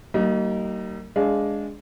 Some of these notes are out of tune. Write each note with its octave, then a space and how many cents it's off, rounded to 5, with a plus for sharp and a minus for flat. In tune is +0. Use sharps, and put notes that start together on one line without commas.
G3 -45 A#3 -25 D#4 +0
G#3 +0 D4 -15 F5 -5